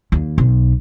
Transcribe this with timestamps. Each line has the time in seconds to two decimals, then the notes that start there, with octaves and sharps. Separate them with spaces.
0.12 D#2
0.38 B1